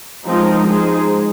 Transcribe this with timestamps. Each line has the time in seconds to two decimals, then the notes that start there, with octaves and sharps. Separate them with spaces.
0.25 F3 G#3 C4 D#4 A#4
0.66 G#3 D#4 G#4 C5